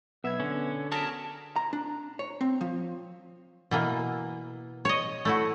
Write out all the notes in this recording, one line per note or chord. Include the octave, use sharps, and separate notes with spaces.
B1 B3 E5 G#6
D3 C#4
F#4 G#4 A#4 A5 A#6 B6 D7
A#5
D4
C#5
C4
F3
B2 E3 A#3
C#5 D#5
A3 E4 F#4